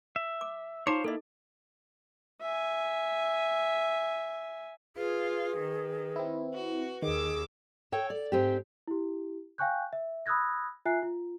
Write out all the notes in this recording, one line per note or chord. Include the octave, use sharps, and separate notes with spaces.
E5
D6
D#4 F4 C5 C#5 A#5 D6
A#3 E4 A4 D#5
E5 G#5
F4 G#4 B4
D#3
C4 E4
F#4
D#2 D#3 G#4 D6 E6
A4 C#5 G5
D5
G#2 C4 G4
E4 G4
F5 G5 G#5 C#6 F#6 G6
E5
B5 D#6 E6 F#6 G#6 A#6
F4 E5 G#5 F#6 C7
F4